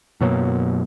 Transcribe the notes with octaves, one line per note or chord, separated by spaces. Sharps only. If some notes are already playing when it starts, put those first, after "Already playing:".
F#2 B2 F#3 A#3